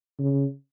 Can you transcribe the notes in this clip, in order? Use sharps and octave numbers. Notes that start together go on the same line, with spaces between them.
C#3